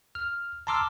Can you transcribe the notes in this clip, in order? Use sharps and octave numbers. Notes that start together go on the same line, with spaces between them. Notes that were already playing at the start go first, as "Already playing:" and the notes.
F6
A5 A#5 C6 D6 E6 F6